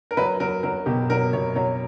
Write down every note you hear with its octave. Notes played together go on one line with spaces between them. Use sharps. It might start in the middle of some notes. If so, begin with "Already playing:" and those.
A#4
F#3 B4
F#3 A#4
F#3 A#4
B2 G4
F#3 A#4
B2 C#5
F#3 C#5